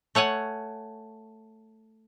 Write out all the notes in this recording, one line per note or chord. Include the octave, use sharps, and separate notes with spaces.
A3 C#5 F#5 G#5